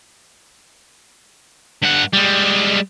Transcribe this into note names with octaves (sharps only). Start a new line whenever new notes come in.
G2 F#5
G3 G#3